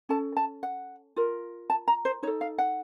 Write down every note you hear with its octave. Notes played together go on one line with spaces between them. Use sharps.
C#4 A4 A5
A5
F#5
F4 A#4
A5
A#5
C5
D#4 A4 C#5
F5
F#5